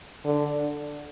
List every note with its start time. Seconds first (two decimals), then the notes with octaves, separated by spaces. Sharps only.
0.25 D3